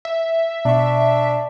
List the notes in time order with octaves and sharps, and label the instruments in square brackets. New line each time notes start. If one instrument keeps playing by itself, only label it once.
[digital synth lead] E5
[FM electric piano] B2 C#6 [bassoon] D4